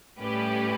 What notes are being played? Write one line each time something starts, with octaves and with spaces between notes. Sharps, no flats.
A2 G3 C#4 G4 B4